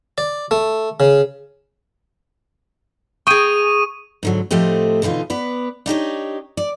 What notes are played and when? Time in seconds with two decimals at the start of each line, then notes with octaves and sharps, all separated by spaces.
0.18 D5
0.51 A3
1.00 C#3
3.27 G#4 G5 C#6 D#6 D#7
4.23 G#2 D3 F#3
4.51 A2 F3 A3 C4 G4 D#5
5.02 B2 D3 E3 D#4 F4
5.30 B3 B4 D5
5.86 D4 D#4 G4 C#5
6.57 D5